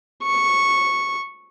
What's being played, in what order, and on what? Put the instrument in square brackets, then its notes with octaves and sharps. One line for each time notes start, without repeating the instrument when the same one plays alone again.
[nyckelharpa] C#6